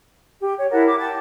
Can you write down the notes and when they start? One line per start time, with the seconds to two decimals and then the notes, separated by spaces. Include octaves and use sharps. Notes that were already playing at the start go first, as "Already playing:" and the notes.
0.41 G4
0.59 C#5
0.71 E4 A#4 F#5 A5
0.85 D6
0.98 G5 A5